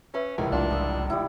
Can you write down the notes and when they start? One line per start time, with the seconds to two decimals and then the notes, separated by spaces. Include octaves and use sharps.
0.14 C#4 B4 E5
0.38 F1 C#2 A2 A#4 G#5
0.52 C2 D4 F4
0.68 B5 D#6 E6
1.10 G3 D#4 E4